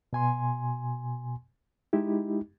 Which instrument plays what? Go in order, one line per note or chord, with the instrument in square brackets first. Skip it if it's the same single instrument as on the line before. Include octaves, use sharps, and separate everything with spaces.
[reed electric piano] B2 G#5 C6
G#3 D#4 E4 G4